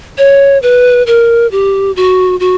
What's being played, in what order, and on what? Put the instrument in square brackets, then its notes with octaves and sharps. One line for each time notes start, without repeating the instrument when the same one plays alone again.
[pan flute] C#5
B4
A#4
G4
F#4
F#4